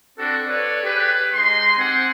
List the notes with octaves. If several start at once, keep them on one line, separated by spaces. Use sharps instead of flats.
C4 D4 F#4 A4
A4 B4 C#5 D5
G4 G#4 B4
G#3 D#4 C6
C4 G4 F#5 G#5